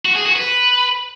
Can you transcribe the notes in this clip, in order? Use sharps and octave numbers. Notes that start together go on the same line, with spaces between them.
F#4
G#4
F#4
B4